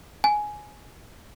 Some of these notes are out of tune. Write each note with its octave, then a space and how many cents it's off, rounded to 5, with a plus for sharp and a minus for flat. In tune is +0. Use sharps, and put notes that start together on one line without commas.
G#5 +10